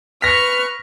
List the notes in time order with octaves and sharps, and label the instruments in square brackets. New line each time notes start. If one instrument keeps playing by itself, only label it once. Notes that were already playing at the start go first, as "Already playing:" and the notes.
[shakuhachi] B4 [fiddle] C#6 F6 [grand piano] A#6 B6